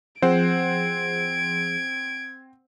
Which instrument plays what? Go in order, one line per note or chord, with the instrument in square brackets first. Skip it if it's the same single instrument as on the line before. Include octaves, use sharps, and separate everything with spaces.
[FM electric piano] F3 G#4 [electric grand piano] C4 C5 F#5 [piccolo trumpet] G#6 [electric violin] D7